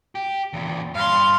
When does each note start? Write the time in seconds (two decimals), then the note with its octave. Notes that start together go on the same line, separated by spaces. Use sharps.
0.15 G4
0.53 E2 A#2
0.95 G2 F5 C6